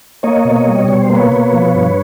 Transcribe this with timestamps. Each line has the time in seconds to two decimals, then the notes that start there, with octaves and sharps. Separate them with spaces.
0.23 A#3 C#5 D#5
0.45 B2
0.55 C#5 D#5
0.67 G3
0.88 B2 C#5
1.01 C5
1.10 A#3
1.15 B4 C#5
1.32 B2
1.53 F3
1.75 G2